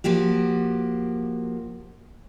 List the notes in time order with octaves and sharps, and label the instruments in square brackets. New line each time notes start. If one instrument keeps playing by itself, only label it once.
[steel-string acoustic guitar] F3 A#3 F#4 G4